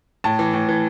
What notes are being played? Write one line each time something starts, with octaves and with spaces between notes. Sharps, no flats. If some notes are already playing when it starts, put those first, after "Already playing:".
A2 A5
E3
A2
E3